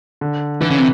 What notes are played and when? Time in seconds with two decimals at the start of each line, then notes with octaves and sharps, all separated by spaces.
0.21 D3
0.61 D3 E3
0.70 C#3
0.78 C3